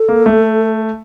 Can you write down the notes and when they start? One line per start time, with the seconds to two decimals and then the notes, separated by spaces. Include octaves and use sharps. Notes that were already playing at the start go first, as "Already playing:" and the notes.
Already playing: A4
0.09 A#3
0.26 A3